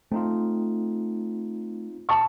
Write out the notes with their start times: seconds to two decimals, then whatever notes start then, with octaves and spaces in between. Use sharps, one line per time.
0.12 A3 C4 D#4 F4
2.09 A5 C#6